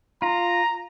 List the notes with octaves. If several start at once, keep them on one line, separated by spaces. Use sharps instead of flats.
F4 A#5